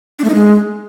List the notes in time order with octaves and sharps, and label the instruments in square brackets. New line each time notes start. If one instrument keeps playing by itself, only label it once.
[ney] D4
A3
D#4
G#3